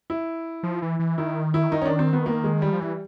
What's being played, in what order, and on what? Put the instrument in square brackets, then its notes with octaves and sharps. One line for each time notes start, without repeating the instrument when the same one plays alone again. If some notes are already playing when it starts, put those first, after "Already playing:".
[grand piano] E4
[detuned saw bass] F3
E3
E3
[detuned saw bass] D#3 [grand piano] E4
[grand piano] E4
[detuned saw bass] D#3 [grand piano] D#4
[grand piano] C#4
D4
C4
B3
A#3
G#3
G3
[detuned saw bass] F3
[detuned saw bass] E3 [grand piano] G3